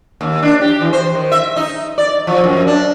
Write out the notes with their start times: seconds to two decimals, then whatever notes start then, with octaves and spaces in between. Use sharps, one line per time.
0.21 D#2
0.43 D4
0.61 G4
0.81 E3
0.93 C5
1.14 D#3
1.32 E5
1.56 D#4
1.98 D5
2.27 F3
2.44 F#2
2.67 D4